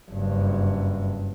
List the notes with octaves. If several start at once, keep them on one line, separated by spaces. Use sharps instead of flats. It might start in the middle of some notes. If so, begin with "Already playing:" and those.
F#1 G2